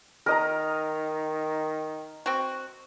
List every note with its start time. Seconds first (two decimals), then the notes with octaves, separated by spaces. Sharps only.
0.26 D#3 A#4 D#5 A#5
2.26 C4 F#4